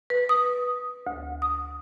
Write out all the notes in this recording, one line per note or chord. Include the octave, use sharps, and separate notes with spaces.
B4
D#6
D2
D#6